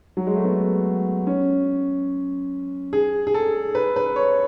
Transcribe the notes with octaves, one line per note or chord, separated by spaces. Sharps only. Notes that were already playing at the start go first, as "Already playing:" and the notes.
F#3
G#3
A3
B3
C#4
G#4
G#4
A4
B4
B4
C#5